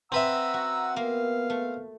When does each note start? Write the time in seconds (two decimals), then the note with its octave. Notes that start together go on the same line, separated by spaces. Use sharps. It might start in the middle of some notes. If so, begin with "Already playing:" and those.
0.12 C4 B4 E5 F#5 A#5 E6
0.54 F#4
0.96 A#3 B3 F5
1.50 A3